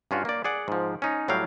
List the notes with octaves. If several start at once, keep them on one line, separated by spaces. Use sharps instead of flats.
G2 C#4 F4 F#4
A#3 D5
G#4 D5 F#5
G#2 F3
C#4 D#4
A2 F#3 G3 F5 G5